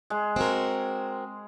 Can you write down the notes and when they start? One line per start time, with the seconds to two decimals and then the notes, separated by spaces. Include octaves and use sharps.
0.10 G#3
0.36 C4 F#4 A#4